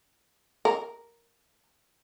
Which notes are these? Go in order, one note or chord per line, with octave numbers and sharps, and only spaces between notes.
A#4